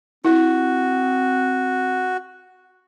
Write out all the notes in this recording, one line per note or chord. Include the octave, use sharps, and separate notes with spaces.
C4 E4 F#4